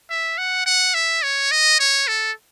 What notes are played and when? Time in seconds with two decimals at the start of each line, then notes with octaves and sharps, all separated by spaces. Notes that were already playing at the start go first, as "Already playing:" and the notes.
0.10 E5
0.38 F#5
0.66 F#5
0.94 E5
1.23 C#5
1.51 D#5
1.80 C#5
2.08 A4